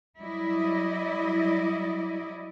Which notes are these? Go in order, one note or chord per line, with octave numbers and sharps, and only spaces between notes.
F#3 G3 E4 D5 D#5